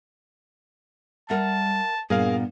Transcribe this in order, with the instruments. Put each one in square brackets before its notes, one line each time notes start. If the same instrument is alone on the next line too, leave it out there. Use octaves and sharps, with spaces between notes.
[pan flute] G3 [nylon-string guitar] A#4 E5 F#5 [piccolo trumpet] A5
[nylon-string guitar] G2 A#2 A#3 [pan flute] B3 [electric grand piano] G#4 A#4 F5